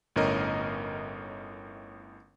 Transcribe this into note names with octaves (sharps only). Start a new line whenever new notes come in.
G1 A2 C#4 A#4 D#5